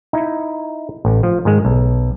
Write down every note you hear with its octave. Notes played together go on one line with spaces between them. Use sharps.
D#4 E4
A1
F3
G#2 D#3 G#3
B1